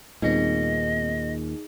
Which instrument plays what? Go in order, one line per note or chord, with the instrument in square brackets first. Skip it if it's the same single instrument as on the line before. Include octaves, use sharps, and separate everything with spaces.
[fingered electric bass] D#2 A#2 [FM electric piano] G3 B3 C4 [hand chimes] D#4 G#4 [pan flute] D#5